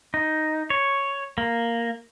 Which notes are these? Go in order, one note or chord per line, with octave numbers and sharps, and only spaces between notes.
D#4
C#5
A#3